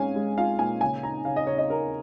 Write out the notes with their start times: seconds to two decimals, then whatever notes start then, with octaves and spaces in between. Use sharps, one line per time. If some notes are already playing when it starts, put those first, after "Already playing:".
Already playing: A#2 G#3 C#4 F5 G#5
0.16 G#3
0.38 F4 F5
0.59 A#2 G#5
0.81 C#3 G#5
1.03 D#4 A#5
1.25 C#3 F5
1.36 D#5
1.47 C#3 C#5
1.58 D#5
1.70 D#4 A#4